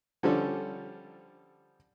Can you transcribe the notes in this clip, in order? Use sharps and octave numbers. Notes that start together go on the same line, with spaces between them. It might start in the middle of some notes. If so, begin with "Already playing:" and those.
D3 F3 G3 C#4 A4